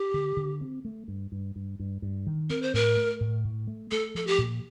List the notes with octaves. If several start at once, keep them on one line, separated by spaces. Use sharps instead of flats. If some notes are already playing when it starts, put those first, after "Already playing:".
Already playing: G4
D3
D3
C4
A3
G2
G2
G2
G2
G2
D#3
C4 A#4
C5
A2 A#4
A3
A2
A2
A3
A3 A4
F3 A4
G4
A#2